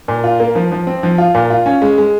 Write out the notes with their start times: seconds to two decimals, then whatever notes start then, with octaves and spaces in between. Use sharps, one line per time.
0.08 A#2
0.24 F4
0.40 A#3
0.55 F3
0.72 F3
0.87 C4
1.03 F3
1.18 F4
1.35 A#2
1.50 F4
1.66 C#4
1.82 G#3
1.98 G#3